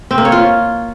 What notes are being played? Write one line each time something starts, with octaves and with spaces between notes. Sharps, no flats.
C4
A#3
C#5
F4